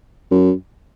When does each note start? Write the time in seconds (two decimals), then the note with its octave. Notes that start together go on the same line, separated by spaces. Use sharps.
0.31 F#2